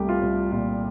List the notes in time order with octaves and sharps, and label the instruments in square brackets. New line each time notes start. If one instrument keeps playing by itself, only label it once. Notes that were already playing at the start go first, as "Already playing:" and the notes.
Already playing: [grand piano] C2 A3 [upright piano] G4
[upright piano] F4
[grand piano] C2
[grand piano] A#2 [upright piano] F4